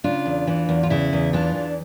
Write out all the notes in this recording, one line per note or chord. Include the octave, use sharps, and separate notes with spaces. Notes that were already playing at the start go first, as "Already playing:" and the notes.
C#3 D4 F4
E2
E3
E2
F4
C#3 E4
E2
E3 D4 F4
E2